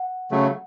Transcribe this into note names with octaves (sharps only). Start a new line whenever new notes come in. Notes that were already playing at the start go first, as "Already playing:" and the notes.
Already playing: F#5
C#3 F#3 A3